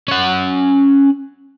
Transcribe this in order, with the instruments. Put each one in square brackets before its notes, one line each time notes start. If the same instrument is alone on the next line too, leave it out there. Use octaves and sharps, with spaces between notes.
[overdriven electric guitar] C#4 F#5